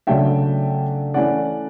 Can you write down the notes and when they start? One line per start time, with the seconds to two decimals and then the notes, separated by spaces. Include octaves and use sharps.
0.07 C#3 F#3 A3 D4 E5 G5
1.14 E3 A3 C#4 E4 D5 F#5